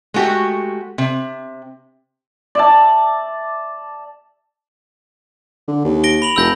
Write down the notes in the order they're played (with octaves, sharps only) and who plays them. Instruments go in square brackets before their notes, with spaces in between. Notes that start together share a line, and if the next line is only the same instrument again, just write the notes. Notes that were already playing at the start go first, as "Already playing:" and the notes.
[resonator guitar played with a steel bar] G#3 A3 F#4 G4
C3
[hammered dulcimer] D5 E5 A5
[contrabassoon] D3
D#2
[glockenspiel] A#6 D7 G7
B5 F7 F#7
[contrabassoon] F1 [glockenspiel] E6 G6 A#6